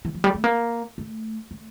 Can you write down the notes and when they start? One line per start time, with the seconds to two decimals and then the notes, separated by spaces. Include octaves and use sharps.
0.05 E3
0.14 F3
0.24 G3
0.35 A3
0.44 A#3
0.98 A3
1.51 A3